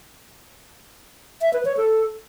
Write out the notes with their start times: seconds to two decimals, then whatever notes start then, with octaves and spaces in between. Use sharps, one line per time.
1.42 E5
1.53 B4
1.65 C#5
1.77 A4